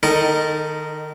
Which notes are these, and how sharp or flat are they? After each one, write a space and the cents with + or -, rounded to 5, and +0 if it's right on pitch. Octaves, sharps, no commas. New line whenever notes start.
D#3 -25 D#4 +0 A4 +5